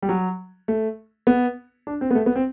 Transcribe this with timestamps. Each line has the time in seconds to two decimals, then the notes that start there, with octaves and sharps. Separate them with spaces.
0.02 G3
0.09 F#3
0.68 A3
1.27 B3
1.87 D4
2.01 C4
2.11 B3
2.15 A3
2.26 B3
2.36 C4